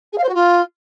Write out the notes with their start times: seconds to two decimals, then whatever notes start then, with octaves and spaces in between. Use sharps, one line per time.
0.12 G#4
0.18 F5
0.23 C5
0.28 F#4
0.34 F4